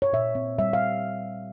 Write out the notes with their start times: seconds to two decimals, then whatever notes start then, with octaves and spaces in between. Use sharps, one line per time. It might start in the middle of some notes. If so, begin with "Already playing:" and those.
0.02 C#5
0.13 A#2 E5
0.35 C4
0.59 G3 E5
0.73 F5